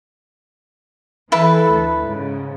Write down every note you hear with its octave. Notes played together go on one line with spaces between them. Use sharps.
E3 E4 A4 B4
D2
G#2 C#3